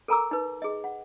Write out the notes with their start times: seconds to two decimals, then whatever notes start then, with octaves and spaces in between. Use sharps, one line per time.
0.08 A4 A#4 G#5 A#5 D6 E6
0.31 D#4 B4
0.62 G#4 D#5
0.84 F#5